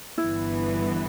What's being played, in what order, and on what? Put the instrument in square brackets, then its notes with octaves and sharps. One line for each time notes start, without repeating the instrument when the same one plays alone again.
[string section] G1 G2 E3 B3 [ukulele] E4